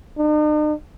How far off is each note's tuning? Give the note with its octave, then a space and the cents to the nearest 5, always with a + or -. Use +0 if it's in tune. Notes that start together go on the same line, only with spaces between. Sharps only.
D#4 -45